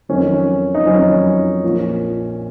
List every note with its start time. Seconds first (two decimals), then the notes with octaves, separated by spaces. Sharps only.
0.09 F2 D#3 F#3 C#4
0.75 D#4
0.86 F2 D#3 F#3 C#4
1.64 A#1 A#2 F3